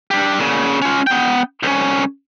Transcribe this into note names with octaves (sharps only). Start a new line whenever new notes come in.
D4 G4
A#2 C#3
C#4 F4
B3 G5
C2 C#4